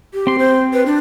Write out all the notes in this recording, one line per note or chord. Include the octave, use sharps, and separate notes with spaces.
G4
C4 C6
C5
B4
D4